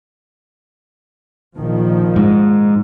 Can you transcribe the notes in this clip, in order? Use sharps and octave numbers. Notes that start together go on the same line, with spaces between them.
A#1 D#3 F3
G#2